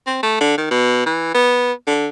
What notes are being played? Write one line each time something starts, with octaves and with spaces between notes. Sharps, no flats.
C4
A3
D3
D#3
B2
E3
B3
D3